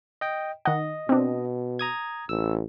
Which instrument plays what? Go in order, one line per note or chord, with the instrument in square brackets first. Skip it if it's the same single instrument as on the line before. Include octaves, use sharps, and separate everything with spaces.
[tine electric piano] D#5 G5
[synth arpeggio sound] D#3 F#5 [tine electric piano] D#5
[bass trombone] B2 [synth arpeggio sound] C4 D4
[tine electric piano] A#5 D#6 G#6
[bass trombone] A1 [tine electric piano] E6